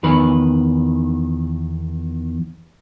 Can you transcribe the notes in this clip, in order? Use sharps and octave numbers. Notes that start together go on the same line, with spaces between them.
E2 D#3 B4